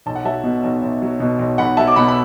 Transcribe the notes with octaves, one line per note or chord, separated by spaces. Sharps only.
B1 A5
F#5
F#3 E5 A5
B2
B1
B1
F#3
B2
B1
B1 F#5 B5
F#3 E5 A5
D6
B2 F#5 B5
B5